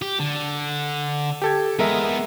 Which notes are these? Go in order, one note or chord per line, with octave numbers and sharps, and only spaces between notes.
G4
D3
G4 A4 G#6
G#3 B3 G#4 A#4 E5